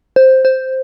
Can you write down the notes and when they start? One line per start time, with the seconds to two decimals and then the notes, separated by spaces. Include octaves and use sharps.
0.16 C5
0.45 C5